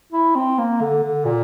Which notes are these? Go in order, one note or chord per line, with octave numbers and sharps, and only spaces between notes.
E4
C4
A#3
D3
D3
A#2